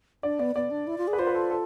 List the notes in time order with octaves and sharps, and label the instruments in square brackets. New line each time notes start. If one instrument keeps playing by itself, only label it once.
[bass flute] D4 [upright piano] D5
[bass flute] B3 [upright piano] D5
[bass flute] B3 [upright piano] D5
[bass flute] D4
E4
F4
G#4
[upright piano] B4
[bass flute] F4 [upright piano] C5
[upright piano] B4
A4
A4